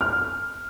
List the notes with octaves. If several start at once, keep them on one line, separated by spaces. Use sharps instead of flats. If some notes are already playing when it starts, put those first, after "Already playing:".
F6